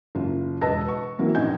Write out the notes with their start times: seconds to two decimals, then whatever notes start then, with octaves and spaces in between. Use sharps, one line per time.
0.15 F#1 F4
0.61 E1 B4 D#5 A5 E6 A#6
0.88 C#6
1.19 E3 F#3 A#3 C4
1.35 A#1 F#2 D#4 D#5 G#5 G6